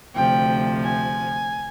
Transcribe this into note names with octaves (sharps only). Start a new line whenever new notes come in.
D2 C3 F3 G5
G#5